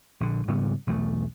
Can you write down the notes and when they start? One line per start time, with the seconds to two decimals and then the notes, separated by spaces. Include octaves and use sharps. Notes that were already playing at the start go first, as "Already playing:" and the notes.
0.20 A#1 D3
0.48 G#2 C#3 G3 B3
0.87 B1 E2 G3 A3